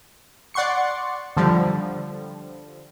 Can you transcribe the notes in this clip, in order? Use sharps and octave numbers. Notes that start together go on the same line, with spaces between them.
D5 F#5 C6 C#6 C#7
D3 F3 G3